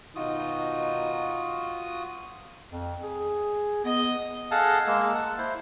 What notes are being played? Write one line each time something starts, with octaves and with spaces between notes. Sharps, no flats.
B2 D#3 D#4 F4 F#4 D#6
F2
G#4
B3 D#5
G#4 A4 D#5 F5 F#5 A5
G#3 A#3 E6
F#5 A5
E4 C5